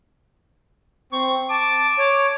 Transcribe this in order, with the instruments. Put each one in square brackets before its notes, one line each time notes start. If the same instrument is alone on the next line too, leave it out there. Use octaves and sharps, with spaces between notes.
[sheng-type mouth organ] C4 [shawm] C#6
[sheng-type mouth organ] A5 [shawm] D6
[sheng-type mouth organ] C#5